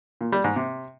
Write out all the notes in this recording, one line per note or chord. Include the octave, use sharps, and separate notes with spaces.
A#2
G3
G#2
C3